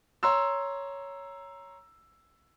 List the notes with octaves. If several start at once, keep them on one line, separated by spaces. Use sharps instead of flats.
C#5 A#5 C6 E6